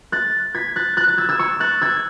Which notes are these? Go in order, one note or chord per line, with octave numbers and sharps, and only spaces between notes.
F#6 A6
G#6 B6
F#6 A6
F#6 A6
F#6 A6
E6 G#6
E6 G#6
C#6 E6
F#6 A6
E6 G#6